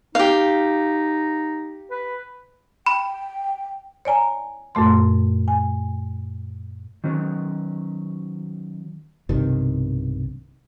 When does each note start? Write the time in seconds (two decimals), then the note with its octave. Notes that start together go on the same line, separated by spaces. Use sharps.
0.15 D#4 G4 F5
1.91 B4
2.86 G5 B5
4.05 C#5 D5 G#5 A#5
4.75 F#2 A#2 A3 C6
5.48 G#5
7.04 D#3 F#3 C#4
9.29 B1 G2 C3 D#3